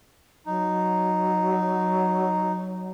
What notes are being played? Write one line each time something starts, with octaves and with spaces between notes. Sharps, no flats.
F#3 D#4